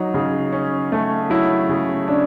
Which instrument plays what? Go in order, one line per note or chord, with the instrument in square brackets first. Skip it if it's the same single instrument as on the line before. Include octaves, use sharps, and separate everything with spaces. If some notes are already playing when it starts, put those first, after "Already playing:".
Already playing: [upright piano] F#3 [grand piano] D#4
[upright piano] C#3
C#4
A3
[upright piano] F#3 [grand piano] E4
[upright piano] C#3
[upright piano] C#4 [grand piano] D4